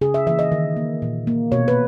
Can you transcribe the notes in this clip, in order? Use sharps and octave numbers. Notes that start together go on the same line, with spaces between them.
C#3 G#4
E5
E3 A#3 E5
D#5
D#3
A#3
A#2
A#3
B2 C#5
B4